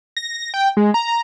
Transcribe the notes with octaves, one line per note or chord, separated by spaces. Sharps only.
A#6
G5
G#3
A#5
A#5